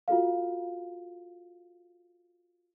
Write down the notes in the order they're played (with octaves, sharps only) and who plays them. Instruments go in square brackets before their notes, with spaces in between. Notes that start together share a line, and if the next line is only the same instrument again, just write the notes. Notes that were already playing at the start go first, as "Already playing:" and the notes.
[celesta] F4 F#4 A4 F5